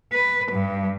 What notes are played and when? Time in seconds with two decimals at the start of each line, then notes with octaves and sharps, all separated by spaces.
0.13 B4
0.52 G2